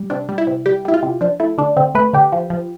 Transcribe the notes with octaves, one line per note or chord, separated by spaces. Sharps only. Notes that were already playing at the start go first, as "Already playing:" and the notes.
Already playing: G3
C3 D4
G3
E4
C3
G3 G4
G3 E4
F4
C3
F3 D4
A3 E4
D3 D4
D3 C4
A3 B4
D3 G4
F3
F3